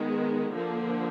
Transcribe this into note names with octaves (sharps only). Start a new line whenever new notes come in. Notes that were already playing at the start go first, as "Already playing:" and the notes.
Already playing: D#3 G#3 B3
D3 F3 A#3